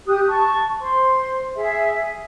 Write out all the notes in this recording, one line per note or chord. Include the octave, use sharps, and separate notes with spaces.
G4 D#6 F#6
A5 C#6
C5 C6
G#4 E5